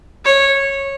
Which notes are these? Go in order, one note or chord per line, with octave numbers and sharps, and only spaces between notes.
C#5